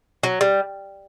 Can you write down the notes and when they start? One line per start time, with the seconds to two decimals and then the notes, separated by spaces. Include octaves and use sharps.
0.23 F#3
0.41 G3